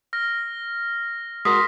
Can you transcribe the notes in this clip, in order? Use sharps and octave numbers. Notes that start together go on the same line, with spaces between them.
F6 A#6
G#3 F#4 A#4 C6 D6 D#6 A#6 B6